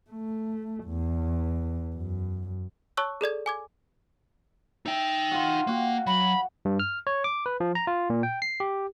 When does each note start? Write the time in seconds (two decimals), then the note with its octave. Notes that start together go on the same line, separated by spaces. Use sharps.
0.11 A3
0.86 E2
1.96 F#2
2.97 C#5 A5 C#6 E6 F#6
3.21 G#4 A4 D5 G#6
3.46 G#5 D6 G#6
4.86 D#4 E5 G5
5.31 F4 F#4
5.67 A#3 F#4 G5
6.07 F#3 B5
6.65 G2
6.80 F6
7.07 C#5
7.24 D6
7.46 B4
7.60 F3
7.75 A#5
7.87 F4
8.10 A#2
8.23 G5
8.42 C7
8.60 G4